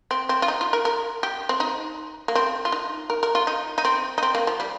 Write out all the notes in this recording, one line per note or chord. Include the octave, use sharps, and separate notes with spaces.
C4
C4
F4
D#4
F4
A#4
A#4
G4
C4
D#4
A#3
C4
F4
D#4
A#4
A#4
F4
D#4
D#4
C4
D#4
C4
A#3
F3
G3